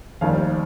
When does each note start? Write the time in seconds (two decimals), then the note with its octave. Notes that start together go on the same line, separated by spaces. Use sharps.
0.21 F1 D#2 D#3 G3 F5